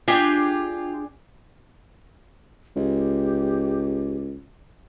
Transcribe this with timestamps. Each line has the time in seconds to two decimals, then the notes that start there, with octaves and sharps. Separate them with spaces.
0.08 D4 F4 G4 G#4
2.76 C#2 G4